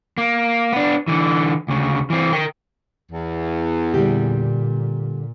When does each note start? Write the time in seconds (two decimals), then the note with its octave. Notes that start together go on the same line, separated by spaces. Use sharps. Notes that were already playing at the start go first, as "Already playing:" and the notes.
0.18 A#3
0.73 B3 D4
1.08 D3 E3
1.68 D2 C#3
2.10 E3 C4
2.33 A#4 G5
3.11 E2
3.94 A#2 D3 G3 G4